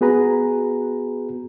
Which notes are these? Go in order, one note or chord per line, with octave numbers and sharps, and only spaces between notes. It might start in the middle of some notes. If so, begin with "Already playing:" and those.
B3 F#4 G#4 B4 A#5